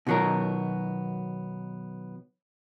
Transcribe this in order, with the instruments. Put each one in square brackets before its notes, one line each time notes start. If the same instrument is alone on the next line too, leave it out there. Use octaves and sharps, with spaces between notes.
[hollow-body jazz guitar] B2 D#3 F#3 B3 A#4